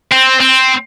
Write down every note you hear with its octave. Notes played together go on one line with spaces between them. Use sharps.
C4
C4